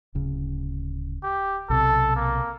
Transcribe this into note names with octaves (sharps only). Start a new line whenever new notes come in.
D1 C#3
G4
B1 C3 A4
A#3